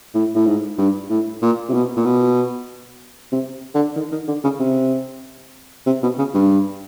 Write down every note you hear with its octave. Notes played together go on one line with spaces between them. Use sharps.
A2
A2
G#2
G2
A2
A#2
C3
B2
A#2
B2
C3
D3
D#3
D#3
D3
C#3
C3
C3
B2
C#3
G2